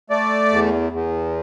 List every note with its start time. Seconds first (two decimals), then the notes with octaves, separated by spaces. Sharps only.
0.10 A3 D5
0.51 E2
0.92 E2